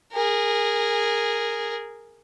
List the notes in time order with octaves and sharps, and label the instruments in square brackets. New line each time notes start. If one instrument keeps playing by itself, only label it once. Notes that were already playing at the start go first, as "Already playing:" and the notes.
[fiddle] G#4 A#4